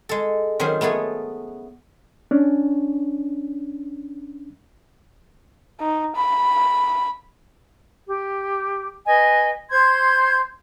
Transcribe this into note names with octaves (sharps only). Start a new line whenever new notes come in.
G#3 A4
D#3 F#3 C#4 C5
A3 B3 G#4 A4
C#4 D4
D#4
B5
G4
B4 D#5 G#5
C5 C6 G6 G#6